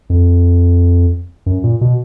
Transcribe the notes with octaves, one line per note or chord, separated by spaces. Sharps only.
F2
F#2
A#2
B2